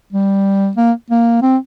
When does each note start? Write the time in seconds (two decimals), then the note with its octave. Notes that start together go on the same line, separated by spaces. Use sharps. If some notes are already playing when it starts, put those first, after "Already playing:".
0.12 G3
0.77 A#3
1.10 A#3
1.42 C4